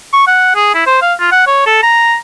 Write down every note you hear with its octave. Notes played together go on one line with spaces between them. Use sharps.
C#6
F#5
G#4
E4
C5
F5
F4
F#5
C#5
A4
A#5